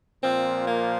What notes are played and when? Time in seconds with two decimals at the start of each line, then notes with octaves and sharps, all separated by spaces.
0.21 A#2 F3 C4
0.66 A#3